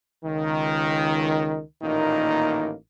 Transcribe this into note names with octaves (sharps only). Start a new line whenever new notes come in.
C#2 D#3
A1 A#2 D#3 A#3 D#4